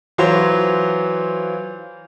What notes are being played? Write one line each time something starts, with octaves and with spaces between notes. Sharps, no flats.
E3 F#3 F4 C5 C#5